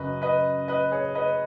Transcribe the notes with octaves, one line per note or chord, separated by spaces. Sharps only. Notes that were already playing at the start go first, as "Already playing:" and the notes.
Already playing: F#2 C#3 B4 D#5
B4 D#5
B4 D#5
G#4 C#5
B4 D#5